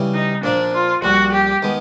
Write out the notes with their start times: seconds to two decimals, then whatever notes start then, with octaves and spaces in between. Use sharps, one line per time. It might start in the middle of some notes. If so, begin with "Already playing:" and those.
Already playing: C#3 E3 G3
0.14 D#4
0.43 A#2 F3 A#3 D4
0.74 F4
1.02 A#1 A#2 G3 F#4
1.33 G4
1.62 D#3 G#3 B3